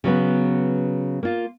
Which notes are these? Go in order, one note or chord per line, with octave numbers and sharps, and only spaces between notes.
C#3 F#3 B3 B4
A#3 F4